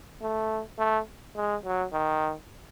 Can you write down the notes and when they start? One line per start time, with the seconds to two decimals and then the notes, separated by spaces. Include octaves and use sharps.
0.22 A3
0.79 A3
1.36 G#3
1.65 F#3
1.93 D#3